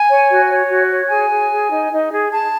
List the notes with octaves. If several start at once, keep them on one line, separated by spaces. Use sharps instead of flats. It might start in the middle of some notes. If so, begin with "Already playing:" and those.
Already playing: G#5
C#5
F#4
C#5
F#4
C#5
G#4 G#5
G#4
G#4
D#4
D#4
G#4
G#4 A5